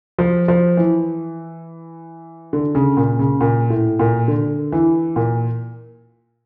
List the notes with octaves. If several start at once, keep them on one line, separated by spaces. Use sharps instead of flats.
F3
F3
E3
D3
C#3
A#2
C#3
A#2
A2
A#2
D3
E3
A#2